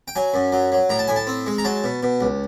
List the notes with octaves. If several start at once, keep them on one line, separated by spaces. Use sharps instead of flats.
G5
F#3 G#5
F#2
F#3
F#3
A2 A#5
A5
A2 G#5
A5
C4
G#3
A#5
F#3 A5
B2
B2
C#2